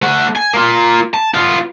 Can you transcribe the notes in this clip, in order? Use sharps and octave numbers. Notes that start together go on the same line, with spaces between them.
A3 F#5
G#5
A#3 F4
A5
B3 F4